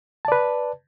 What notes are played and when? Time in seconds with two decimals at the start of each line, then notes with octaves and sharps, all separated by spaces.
0.25 A5
0.28 D5
0.32 B4